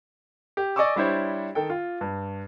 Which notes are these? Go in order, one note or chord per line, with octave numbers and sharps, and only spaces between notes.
G4
D5 D#5 G#5 C#6 D6 E6
G3 D4 E4 C5 C#5
D#3 A4 G5
F4
G2